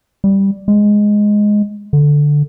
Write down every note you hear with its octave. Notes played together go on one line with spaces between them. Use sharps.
G3
G#3
D3